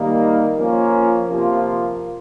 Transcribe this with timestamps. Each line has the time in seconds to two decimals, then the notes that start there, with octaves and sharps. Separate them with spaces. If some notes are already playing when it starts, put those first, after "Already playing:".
Already playing: D#3 G3 A#3
0.58 F3 A#3 C#4 F4
1.28 C3 F3 A#3 F4